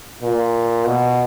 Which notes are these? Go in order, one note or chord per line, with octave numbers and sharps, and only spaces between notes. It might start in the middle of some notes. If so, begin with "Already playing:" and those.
A#2
B2